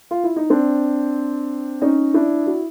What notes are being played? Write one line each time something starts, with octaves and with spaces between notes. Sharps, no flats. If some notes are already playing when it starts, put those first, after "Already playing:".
F4
E4
D#4
C4 D4
C#4 D#4
D4 E4
E4 F#4